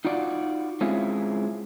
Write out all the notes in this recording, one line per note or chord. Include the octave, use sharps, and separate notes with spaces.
D#4 F4 F#4 D5
G#3 C4 C#4 E4 F4 G#4